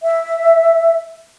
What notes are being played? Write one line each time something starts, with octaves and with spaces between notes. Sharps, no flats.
E5